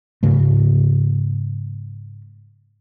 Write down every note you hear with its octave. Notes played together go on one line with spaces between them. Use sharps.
G#2 C#3 A3